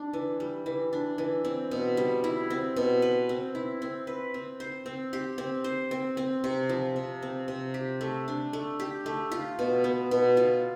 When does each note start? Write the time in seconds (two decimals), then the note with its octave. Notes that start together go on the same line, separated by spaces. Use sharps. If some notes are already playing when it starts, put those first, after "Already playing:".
Already playing: D4
0.13 E3
0.40 G3
0.66 E3
0.93 D4
1.18 E3
1.45 C4
1.71 B2
1.97 G3
2.24 E4
2.50 C4
2.76 B2
3.02 B4
3.29 C4
3.55 E4
3.82 C4
4.07 B4
4.34 C4
4.60 C5
4.86 C4
5.13 G4
5.38 C4
5.64 C5
5.91 C4
6.17 C4
6.44 C3
6.69 F3
6.96 C3
7.22 C4
7.48 C3
7.74 G4
8.01 A3
8.28 D4
8.53 A3
8.80 G4
9.06 A3
9.32 F4
9.59 B2
9.84 B3
10.11 B2
10.37 F4